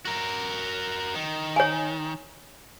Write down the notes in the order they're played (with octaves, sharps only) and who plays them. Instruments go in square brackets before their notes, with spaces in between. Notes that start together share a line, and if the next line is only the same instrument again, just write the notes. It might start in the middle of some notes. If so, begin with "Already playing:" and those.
[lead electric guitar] F#4 A#4
D#3
[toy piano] C#5 G#5